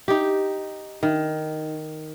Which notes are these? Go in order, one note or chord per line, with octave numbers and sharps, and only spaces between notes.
D#4 G4
D#3